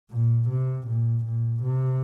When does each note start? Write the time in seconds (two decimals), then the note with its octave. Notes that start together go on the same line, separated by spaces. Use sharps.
0.11 A#2
0.49 C3
0.88 A#2
1.25 A#2
1.63 C3